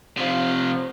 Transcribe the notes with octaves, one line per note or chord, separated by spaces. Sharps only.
C3 F3